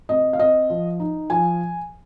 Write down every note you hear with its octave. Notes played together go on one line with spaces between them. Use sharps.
C3 D#5
F5
C4 D#5
F3
D#4
F3 G#5